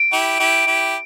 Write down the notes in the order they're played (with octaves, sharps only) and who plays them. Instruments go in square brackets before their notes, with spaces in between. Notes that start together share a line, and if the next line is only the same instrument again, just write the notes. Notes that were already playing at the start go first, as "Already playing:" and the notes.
Already playing: [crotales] D7
[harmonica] E4 G4
E4 G4
E4 G4